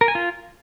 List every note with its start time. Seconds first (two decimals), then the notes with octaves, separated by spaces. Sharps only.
0.01 A#4
0.08 G#5
0.15 F4